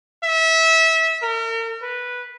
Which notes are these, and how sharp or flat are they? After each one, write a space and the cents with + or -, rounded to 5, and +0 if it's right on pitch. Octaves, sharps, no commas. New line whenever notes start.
E5 -25
A#4 -40
B4 -10